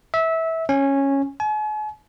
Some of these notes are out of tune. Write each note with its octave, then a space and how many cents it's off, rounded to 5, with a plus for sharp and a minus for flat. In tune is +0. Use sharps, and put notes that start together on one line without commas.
E5 -20
C#4 -10
G#5 +45